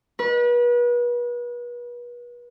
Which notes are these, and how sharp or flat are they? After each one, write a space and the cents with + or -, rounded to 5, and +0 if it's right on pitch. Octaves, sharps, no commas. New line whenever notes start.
B4 -35